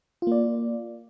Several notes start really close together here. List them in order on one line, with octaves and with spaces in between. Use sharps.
F4 A#3 D5